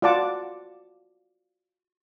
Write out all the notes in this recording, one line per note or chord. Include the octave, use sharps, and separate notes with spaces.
F4 F#4 D5 F#5 A5 D6